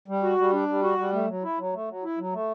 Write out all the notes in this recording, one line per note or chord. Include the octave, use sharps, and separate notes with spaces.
G3
F#4
G3
D4
G3
F#4
G3
A3
F#3
E4
F#3
A3
F#3
E4
F#3
A3